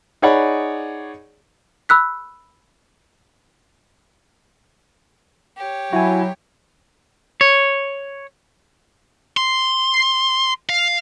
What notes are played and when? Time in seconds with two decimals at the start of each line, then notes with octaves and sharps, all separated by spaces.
0.22 D#4 G#4 C#5 D5 F#5 B5
1.89 B5 E6 F#6 B6
5.57 G4 C#5
5.93 F#3 E4 F#4 G#5
7.41 C#5
9.37 C6
10.69 F5